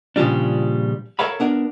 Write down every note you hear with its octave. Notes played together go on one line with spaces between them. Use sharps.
A#2 C#3 F3 G3 D4
A4 A#4 C#5 E5 F5 B5
B3 D4 A#4